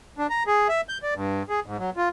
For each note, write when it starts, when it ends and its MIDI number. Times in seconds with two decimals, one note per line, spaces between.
0.18 0.27 62
0.30 0.43 82
0.47 0.68 68
0.69 0.81 76
0.89 0.98 91
1.03 1.14 74
1.15 1.43 43
1.49 1.60 68
1.66 1.77 44
1.78 1.90 54
1.97 2.09 65